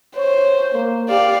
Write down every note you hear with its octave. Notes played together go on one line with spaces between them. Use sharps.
C5 C#5
A#3
G4 D5 F5